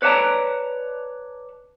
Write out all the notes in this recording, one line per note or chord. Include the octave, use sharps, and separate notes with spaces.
B4 C#5 D5 E5 A5 A#5